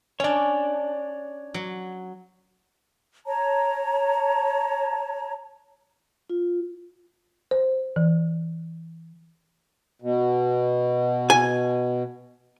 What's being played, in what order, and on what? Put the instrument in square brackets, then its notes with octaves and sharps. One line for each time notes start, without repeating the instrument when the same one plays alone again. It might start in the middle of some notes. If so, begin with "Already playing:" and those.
[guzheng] C#4 D4 [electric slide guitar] C#5 D5
[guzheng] F#3
[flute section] C#5 A5 A#5
[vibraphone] F4
[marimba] C5
E3
[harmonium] B2
[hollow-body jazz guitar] G#5